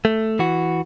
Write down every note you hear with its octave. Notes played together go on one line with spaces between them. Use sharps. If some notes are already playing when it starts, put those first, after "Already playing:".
A3
E3 F#4